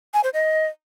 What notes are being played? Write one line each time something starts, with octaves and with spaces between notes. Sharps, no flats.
G#5
C5
D#5